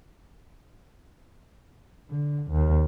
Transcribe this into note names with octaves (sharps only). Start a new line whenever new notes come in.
D3
D#2